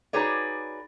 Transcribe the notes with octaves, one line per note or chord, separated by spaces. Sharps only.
D#4 F#4 G#4 B4 C#5 D5